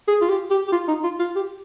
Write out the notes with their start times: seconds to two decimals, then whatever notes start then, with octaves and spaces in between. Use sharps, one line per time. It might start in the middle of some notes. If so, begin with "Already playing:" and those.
0.08 G#4
0.21 F4
0.29 G4
0.51 G4
0.68 G4
0.72 F4
0.88 D#4
1.04 F4
1.20 F4
1.36 G4